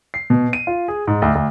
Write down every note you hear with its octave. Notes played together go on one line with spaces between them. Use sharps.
C7
B2
D#7
F4
G#4
G#2
D2
D2